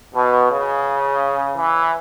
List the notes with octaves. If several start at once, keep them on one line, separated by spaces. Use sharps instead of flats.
B2
C#3
E3